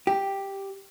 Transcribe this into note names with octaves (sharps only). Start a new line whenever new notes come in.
G4